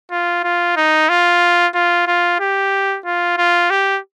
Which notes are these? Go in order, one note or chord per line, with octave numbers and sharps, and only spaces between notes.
F4
F4
D#4
F4
F4
F4
G4
F4
F4
G4